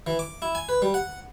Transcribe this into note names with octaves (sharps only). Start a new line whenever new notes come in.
E3
D6
E4
G#5
B4
G3
F#5